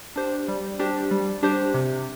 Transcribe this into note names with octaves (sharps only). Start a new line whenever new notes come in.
D4 G4 C5
G3
D4 G4 C5
G3
D4 G4 C5
C3